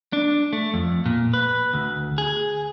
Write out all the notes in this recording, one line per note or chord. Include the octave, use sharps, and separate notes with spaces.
D4
A3
F2
A#2
B4
D2
G#4